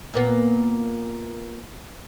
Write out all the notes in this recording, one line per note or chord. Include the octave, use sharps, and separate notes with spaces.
A#2 A#3 B3